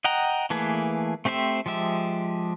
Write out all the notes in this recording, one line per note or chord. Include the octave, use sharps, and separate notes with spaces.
D#5 F#5 G5 A#5
E3 A3 A#3 G#4 B4
A3 C4 G4 C5 E5
F3 G#3 G4 E5